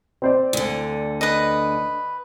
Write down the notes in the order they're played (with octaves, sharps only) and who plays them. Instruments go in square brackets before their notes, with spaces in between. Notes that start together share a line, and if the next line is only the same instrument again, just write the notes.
[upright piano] C4 C5 D5
[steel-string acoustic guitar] D2 D3
[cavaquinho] B4 D#5